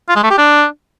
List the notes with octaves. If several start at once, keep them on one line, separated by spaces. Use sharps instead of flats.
F4
G#3
A3
G4
D4